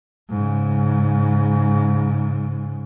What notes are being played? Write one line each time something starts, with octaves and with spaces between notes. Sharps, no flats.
G#2 C#3